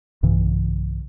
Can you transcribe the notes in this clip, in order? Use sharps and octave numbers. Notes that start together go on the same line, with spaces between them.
B1 G2 C#3 E3